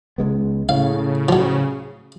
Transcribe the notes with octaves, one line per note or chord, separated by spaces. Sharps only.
C#2 G#3 B3
A2 C#3 F5
F3 F#3